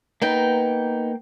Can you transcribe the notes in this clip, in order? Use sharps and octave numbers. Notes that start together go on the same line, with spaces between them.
A#3 B3 D#4 G5